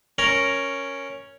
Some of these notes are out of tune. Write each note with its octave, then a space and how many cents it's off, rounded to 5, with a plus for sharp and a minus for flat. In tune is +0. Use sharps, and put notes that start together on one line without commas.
C#4 +0 A#4 +0 A#5 +0